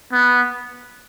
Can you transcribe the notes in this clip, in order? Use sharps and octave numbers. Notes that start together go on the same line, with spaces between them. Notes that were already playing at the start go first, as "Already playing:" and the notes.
B3